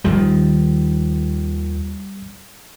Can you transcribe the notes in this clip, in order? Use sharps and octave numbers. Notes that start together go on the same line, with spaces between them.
D#2 D#3 F3 G3